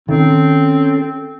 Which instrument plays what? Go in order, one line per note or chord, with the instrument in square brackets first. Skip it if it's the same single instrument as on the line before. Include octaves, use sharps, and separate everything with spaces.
[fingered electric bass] D#3 [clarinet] C4 [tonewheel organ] C#4 A4